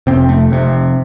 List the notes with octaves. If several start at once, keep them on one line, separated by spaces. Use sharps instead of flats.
F1 F2 C3 C4
A3
F1 F2 C3